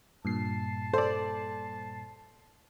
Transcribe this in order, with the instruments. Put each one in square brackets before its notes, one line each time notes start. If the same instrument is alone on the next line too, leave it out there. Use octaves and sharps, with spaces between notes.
[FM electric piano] G2 A#2 C7 [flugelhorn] A5
[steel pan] A4 [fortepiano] C5 D5